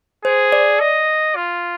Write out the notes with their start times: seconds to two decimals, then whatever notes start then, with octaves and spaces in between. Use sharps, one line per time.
0.25 G#4 C5
0.52 D5
0.80 D#5
1.36 F4